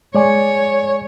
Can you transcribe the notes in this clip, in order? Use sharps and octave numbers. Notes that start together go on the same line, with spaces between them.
G#3 C#5 D5 G#5